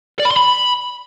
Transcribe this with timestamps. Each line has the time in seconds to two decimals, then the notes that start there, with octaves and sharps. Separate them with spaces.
0.20 D5
0.25 B5
0.31 C6
0.36 B5